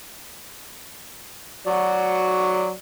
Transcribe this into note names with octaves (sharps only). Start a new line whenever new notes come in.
F#3 F#4 D5